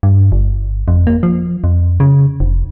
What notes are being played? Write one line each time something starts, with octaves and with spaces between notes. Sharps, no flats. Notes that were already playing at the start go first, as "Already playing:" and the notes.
G2
G1
F2
A#3
F3
F2
C#3
F1